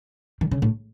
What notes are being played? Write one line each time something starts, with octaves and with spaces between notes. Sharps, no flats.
D#3
C#3
A2